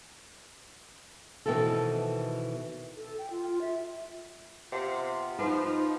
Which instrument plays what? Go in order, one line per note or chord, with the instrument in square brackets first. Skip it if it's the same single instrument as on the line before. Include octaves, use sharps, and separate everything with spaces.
[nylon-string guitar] B2 D#3 E3 C4 A4
[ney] A4
G5
F4
E5
[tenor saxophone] C3 [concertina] B3 F4
[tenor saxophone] F3 [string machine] D#4 [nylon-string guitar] B4